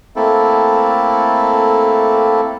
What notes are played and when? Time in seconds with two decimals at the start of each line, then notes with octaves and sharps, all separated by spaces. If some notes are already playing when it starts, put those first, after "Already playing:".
0.16 A3 A#3 C4 E4 A4